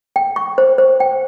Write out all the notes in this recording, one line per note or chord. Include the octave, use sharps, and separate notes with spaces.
G5
C#6
C5
C5
G5